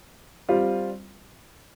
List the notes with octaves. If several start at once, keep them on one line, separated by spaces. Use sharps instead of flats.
G3 C4 F4